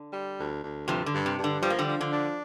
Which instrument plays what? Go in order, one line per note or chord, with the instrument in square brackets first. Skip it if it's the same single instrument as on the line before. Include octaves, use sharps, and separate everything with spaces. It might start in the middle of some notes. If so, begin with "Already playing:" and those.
Already playing: [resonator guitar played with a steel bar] D3
[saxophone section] G3
D2
D2
[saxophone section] G2 [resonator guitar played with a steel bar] C3 F3
[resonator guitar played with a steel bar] D3
[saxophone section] G2
[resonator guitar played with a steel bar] C3
[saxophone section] G2
[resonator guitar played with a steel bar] D3
[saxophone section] F3 [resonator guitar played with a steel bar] G3
[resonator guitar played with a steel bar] A#3
D3 G3
[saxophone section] F3
[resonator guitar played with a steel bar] D3
[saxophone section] D4